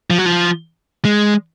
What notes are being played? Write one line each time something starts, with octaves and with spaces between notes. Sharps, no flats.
F3
F#3
F3
G#3